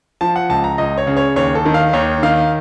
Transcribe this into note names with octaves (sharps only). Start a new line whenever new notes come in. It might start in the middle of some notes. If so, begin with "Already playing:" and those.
F3 A5
F#5
C#2 A5
A#5
C#2 D#5
C#5
C#3
C#5
D#2 C#5
A4
D#3
F5
D#2 C#5
D#3 F5